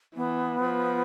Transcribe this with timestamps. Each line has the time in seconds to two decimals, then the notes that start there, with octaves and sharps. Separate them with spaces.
0.15 E3 B3
0.62 F3